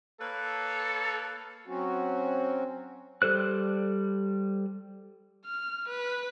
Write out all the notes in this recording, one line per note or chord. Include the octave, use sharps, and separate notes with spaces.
A#3 A4 B4 C#5
F#3 C4 C#4 F#4
G3 A4 C5 F#6
F6
B4